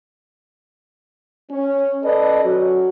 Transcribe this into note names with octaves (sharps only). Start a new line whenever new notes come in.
C#4
A4 B4 D5 D#5
F#3 C#4 F#4